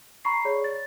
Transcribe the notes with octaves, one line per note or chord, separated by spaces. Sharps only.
A#5 B5 C#6 C7
G#4 C#5 D5
A6